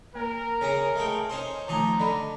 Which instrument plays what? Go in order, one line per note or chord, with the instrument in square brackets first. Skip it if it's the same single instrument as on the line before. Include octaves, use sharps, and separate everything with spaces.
[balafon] A#3 [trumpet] A#4
[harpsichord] C#3 C#4 A#5 [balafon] C#5
[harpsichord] G#3 A3 G5 [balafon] E5
[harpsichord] C#4 D#4 C5
[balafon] D#3 A3 [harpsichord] F3 D#4 [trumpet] A#5
[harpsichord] D3 [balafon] D5 D#5 B5